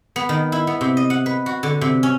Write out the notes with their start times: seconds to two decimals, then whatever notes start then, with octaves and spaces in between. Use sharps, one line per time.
0.16 B3
0.29 D#3
0.52 E4
0.67 B3
0.81 C3
0.97 D#5
1.10 F#5
1.26 B4
1.46 F#4
1.63 D3
1.81 C3
2.03 C#4